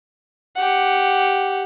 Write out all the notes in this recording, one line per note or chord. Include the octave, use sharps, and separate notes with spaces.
G4 F#5